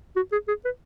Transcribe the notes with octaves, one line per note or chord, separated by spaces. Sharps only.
F#4
G#4
G#4
B4